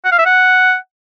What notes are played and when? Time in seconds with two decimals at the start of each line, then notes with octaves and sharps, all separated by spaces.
0.05 F#5
0.12 F5
0.19 E5
0.26 F#5